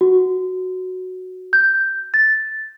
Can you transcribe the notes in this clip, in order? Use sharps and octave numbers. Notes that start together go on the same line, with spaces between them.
F#4
G6
A6